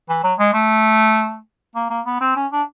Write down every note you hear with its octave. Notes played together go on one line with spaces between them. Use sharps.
E3
F#3
G#3
A3
A#3
A#3
B3
C4
C#4
D4